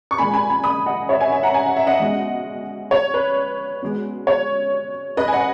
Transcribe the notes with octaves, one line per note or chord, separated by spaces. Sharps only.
C#6
A#2 G#3 G#5 B5
G#5 B5
G#5 B5
B5 D#6
D#5 F#5
C#5 E5
E5 G#5
E5 G#5
F#5 A#5
G#5
F#5
E5
D#5 F#5
B2 G#3
C#5
B4
B2 G#3
C#5
B4 D#5
G#5
D#5 F#5